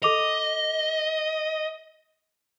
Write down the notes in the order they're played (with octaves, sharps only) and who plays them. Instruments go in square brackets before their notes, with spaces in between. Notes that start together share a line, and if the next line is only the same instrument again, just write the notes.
[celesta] A4 D6 F7 [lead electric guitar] D#5